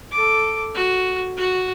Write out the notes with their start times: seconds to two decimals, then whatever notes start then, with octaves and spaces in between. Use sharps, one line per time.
0.11 A4 D6
0.75 F#4
1.37 F#4